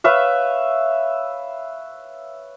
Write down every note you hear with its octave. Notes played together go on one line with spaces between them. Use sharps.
B4 C#5 E5 F5